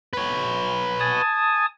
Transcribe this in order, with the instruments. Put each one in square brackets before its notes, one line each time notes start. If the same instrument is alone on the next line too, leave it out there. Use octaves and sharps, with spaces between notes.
[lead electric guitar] B4 C#5
[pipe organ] G#5 A5 D#6